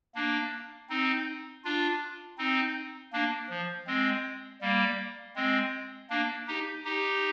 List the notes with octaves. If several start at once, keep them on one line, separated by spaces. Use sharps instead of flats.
A#3 D4
C4 D#4
D4 F4
C4 D#4
A#3 D4
F3
G#3 C4
G3 A#3
G#3 C4
A#3 D4
D#4 G4
D#4 G4